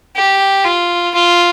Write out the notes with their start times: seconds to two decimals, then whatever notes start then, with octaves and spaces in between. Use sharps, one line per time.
0.16 G4
0.64 F4
1.14 F4